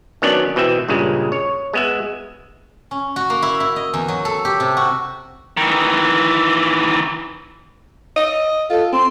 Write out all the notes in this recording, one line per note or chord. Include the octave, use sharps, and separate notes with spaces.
D#3 F#3 B3 C#4 D4 D5
B2 E3 C4 E5
G2 A#2 C#3 G#3
C#5
G#3 B3 E5
C#4
F#4
A#3
E4
E4
D#5
E2
F#3
A4
G4
C3
F#4
D#3 E3
D#5
F4 A4
C4 C6